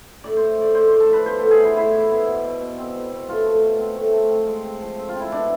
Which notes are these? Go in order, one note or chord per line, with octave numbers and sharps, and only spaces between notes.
A2 D5
A2 C5
A2 D5
A2 C5
A2 C5
A4
F3 B4
B3 C5
A2 A4
G#4
E3 E4
A2 E4
A2
B3
B2
B2
B2
C4
C4
B2
A3 F4
A3
B2
C4
A3
A3
C4
G#3
C4
F3
C4
F4
C4 E4
B2 D4